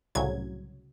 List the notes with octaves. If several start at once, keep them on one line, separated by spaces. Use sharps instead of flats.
C2 A2 C#3 F#3 G#6